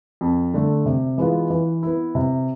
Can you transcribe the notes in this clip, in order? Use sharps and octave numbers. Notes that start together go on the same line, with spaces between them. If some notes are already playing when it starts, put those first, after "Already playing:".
F2
D3 A3
C3
E3 G#3 B3 F4
E3
B3 E4
C3